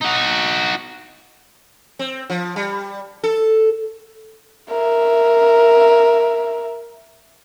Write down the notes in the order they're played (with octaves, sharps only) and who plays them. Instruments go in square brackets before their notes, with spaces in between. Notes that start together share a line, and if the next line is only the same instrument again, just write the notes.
[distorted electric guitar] D#4 F#4
[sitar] C4
F3
G3
A4
[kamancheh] A#4 E5